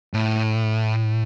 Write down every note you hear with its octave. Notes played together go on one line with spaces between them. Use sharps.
A2